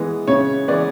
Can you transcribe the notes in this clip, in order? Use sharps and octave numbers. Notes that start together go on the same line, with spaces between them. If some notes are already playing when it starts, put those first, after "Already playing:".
Already playing: E3 G#3 B3
C#3 C#5
E3 G#3 B3 D5